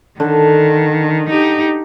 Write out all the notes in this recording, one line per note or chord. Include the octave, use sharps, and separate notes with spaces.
D3 D#3
D#4 G4